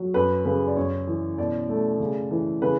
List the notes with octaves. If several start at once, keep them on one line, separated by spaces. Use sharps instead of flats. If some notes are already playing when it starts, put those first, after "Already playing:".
Already playing: F#3
F#2 B4
C#3 B4
D5
F#2 C#5
E3
B2 D5
A3
C#3
E3
C#3 B4